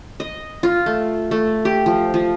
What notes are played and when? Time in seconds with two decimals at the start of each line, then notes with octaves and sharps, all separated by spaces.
0.20 D#5
0.63 F4
0.86 A3
1.31 A3
1.65 G4
1.86 F3
2.14 F3